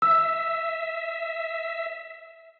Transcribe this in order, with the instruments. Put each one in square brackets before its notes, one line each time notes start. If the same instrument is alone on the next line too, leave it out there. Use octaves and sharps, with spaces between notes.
[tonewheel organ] E5 [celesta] E6